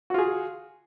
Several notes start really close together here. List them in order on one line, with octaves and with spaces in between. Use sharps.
F#4 F4 G#4